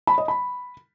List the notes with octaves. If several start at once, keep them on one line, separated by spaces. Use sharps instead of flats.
B5
D#5
B5